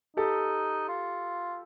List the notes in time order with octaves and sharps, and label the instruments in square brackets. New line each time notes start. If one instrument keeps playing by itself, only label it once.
[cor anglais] D#4 [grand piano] G4 A4
[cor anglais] F4